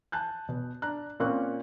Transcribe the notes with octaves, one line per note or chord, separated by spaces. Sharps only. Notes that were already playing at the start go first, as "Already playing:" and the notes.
G#5 A5 F#6 G6
B2
D4 A#5 F#6
A#2 A#3 C4 C#4 C#6 F#6